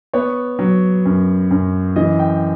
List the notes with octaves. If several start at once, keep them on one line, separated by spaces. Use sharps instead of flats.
B3 C#5
F#3
F#2
F#2
E3 D#5
G5